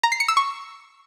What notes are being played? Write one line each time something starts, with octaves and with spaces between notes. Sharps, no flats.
A#5
C7
C#7
E6
C#6